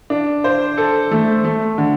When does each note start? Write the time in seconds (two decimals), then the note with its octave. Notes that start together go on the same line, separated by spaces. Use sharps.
0.10 D4
0.44 C5
0.78 A4
1.11 A3
1.44 A3
1.78 D3